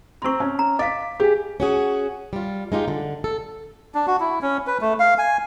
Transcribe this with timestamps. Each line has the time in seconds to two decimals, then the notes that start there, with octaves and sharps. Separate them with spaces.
0.22 C4 A#5 C6 C#6
0.40 C#4
0.59 A#5
0.79 D#5 F5 D6 B6
1.20 G4 G#4 G#5
1.60 C#4 F#4 G#4
2.33 G3 F4
2.72 G#3 D#4 F4 G4
2.88 D3
3.24 A4
3.95 D4
4.07 F#4
4.20 E4
4.42 C#4
4.67 B4
4.81 A3
5.00 F5
5.18 G#5